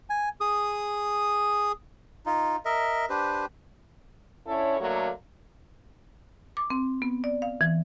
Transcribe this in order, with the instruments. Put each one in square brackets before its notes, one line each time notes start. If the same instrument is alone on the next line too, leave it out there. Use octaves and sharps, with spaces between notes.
[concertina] G#5
G#4 D#6
[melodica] D#4 F4
A#4 D#5 E5
D4 G4 B4 C5
[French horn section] D3 C#4 E4 A4 C#5
D3 F#3 A3 A#3
[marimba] D6
C4
B3
D5
F5
E3